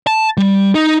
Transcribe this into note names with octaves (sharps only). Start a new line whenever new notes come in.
A5
G3
D#4